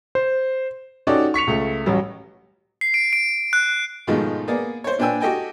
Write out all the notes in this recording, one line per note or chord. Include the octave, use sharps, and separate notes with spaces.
C5
C#4 D#4 F#4 G4 A4 D5
C#6 B6 C#7 F7
C#2 A3
A1 F#3 G3
C7
D7
D7
F#6
G#2 B2 D#3 F3 G#3 A3
A#3 B3 G#4 D5
C5 C#5
A#2 D4 B4 G5 G#5 E6
F#4 G4 A4 D#5 G5 G#5